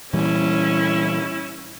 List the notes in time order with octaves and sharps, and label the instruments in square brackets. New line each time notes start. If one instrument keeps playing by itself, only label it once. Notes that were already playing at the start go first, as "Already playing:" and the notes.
[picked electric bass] A#2 E3 G3 [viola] C#4 E4